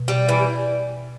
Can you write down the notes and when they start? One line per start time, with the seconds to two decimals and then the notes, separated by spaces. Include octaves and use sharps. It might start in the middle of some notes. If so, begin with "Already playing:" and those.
Already playing: B2
0.08 G3
0.29 E3